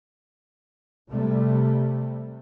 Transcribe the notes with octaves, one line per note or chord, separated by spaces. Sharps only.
C3 G3 A3